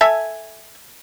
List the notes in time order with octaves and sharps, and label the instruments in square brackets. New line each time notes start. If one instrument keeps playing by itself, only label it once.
[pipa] A4 E5 G#5